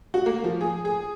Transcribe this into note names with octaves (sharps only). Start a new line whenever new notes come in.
F#4
A#3
F3
G#4
G#4